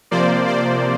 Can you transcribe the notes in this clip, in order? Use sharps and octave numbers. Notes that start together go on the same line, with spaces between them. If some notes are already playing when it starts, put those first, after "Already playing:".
C3 F3 A#3 C5 D5
C5 D5